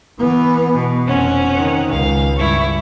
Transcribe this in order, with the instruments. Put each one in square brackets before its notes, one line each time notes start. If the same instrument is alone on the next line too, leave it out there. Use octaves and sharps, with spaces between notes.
[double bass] E3 B3
[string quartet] B2
[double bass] F1 [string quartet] C4 C#4 F#5
[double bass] D#3
[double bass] C#2 [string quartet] F5
[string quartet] G2 E4 C#6